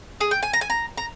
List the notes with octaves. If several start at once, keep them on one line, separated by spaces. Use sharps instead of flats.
G#4
G5
G#5
A#5
G#5
A#5
A#5